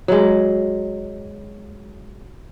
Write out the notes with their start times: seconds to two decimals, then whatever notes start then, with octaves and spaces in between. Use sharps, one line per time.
0.08 F#3 G#3